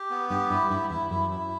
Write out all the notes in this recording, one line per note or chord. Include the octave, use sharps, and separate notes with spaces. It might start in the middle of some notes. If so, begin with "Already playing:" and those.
Already playing: G4
B3
G2 G4
G2 E4
G2 E4
E2 E4
F#2 E4
E4